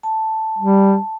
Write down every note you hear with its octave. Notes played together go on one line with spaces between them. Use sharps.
A5
G3